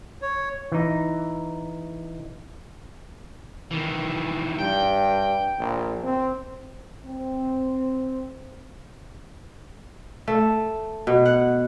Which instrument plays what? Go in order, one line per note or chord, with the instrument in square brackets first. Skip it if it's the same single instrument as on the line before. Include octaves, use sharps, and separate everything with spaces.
[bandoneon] C#5
[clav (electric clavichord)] E3 D#4
[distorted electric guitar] D#3 E3
[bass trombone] G2 [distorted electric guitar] G5
[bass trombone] A#1
C4
[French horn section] C4
[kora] A3
B2
F#5